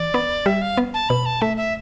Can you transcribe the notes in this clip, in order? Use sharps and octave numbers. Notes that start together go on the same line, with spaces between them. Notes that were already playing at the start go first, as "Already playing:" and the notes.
Already playing: E3 D5
B3
G3 E5
F5
B3
A5
B2 B5
A5
A3 E5
E5